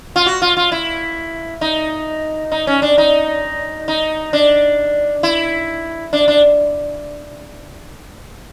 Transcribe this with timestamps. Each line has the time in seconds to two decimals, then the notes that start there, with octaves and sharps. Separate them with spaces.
0.16 F4
0.26 F#4
0.42 F4
0.57 F4
0.72 E4
1.61 D#4
2.52 D#4
2.67 C#4
2.82 D4
2.98 D#4
3.88 D#4
4.33 D4
5.23 E4
6.13 D4
6.28 D4